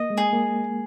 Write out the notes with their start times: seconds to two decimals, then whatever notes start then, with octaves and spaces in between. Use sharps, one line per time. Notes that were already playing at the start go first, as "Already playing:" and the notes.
Already playing: A#3 D#5
0.10 G#3
0.18 G#4
0.33 A#3